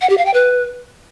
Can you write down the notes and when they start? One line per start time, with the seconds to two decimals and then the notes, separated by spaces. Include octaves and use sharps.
0.02 F#5
0.10 G4
0.18 F5
0.26 G5
0.34 B4